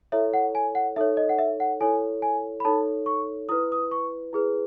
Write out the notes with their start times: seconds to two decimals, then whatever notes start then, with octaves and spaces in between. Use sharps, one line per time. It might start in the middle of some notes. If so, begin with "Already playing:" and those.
0.12 E4 A4 C#5 E5
0.33 F#5
0.55 G#5
0.75 F#5
0.96 D#4 A4 C#5 E5
1.17 D#5
1.29 F#5
1.38 E5
1.60 F#5
1.80 E4 A4 C#5 G#5
2.22 G#5
2.60 B5
2.65 D#4 A4 C#5 A5
3.06 C#6
3.49 E4 B4 D#6
3.72 D#6
3.91 C#6
4.33 E4 G#4 B4